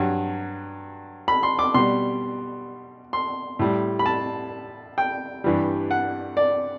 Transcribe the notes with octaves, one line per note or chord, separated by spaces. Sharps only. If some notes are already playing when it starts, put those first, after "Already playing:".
Already playing: G2 F#3
B5
C6
D6
B2 G3 C6
C6
A2 G3
B5
A5
G5
G2 E3 G3
F#5
D5